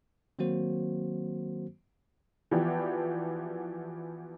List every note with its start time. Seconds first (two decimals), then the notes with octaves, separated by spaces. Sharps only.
0.39 D#3 F#3 A#3 C4 F#4 C5
2.51 E3 F3 B3 F#4 G4 D5